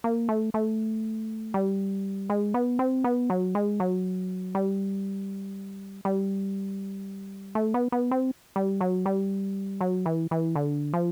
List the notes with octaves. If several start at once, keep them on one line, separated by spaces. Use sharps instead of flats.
A#3
A3
A3
G3
G#3
B3
C4
B3
F#3
G#3
F#3
G3
G3
A3
B3
B3
C4
G3
F#3
G3
F#3
E3
E3
D3
F3